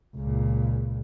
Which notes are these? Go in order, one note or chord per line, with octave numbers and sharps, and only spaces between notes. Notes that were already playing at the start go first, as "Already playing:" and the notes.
C#2 A#2